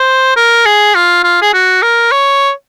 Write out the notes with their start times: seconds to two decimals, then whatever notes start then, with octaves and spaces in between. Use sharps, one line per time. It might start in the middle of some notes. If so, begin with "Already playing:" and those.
Already playing: C5
0.36 A#4
0.65 G#4
0.95 F4
1.24 F4
1.42 G#4
1.54 F#4
1.83 A#4
2.12 C#5